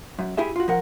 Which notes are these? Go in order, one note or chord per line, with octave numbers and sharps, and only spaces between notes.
F#2
E4 G4 G#4 E5
F4 F#4
F3 A#4 F#5